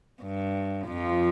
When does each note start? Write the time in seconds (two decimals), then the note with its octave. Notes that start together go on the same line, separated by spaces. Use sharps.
0.21 G2
0.87 F2 F3